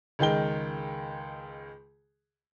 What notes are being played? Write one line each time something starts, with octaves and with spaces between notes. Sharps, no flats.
C#2 D#3 G#3 G5 G7